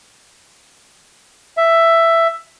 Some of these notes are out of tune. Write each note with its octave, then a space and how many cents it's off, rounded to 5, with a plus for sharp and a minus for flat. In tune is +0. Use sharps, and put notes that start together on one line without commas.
E5 +10